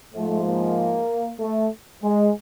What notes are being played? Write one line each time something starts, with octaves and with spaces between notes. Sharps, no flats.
G#2 F3 G#3 A3
A#3
A3
G#3